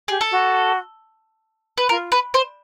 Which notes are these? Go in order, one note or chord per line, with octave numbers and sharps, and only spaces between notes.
G4 G#4
A4
F#4
B4
F4 A#4
B4
C5